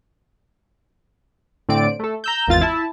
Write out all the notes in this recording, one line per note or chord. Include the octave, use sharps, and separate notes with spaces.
A2 D3 C4 D5 D7
A3 A4
A#5 E6 G6
G#1 E2 F4 A6
E4 A5